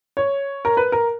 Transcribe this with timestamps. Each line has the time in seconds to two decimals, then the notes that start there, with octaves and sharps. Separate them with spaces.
0.17 C#5
0.65 A#4
0.77 B4
0.92 A#4